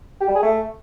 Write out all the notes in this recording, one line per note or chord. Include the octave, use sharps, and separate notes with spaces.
G4
G3
G#4
A3